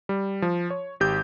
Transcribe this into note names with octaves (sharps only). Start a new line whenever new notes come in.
G3
F3
C#5
G#1 G4 G6